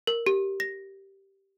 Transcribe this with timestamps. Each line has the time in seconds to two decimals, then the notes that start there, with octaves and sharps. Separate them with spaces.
0.07 A#4
0.26 G4
0.60 A#6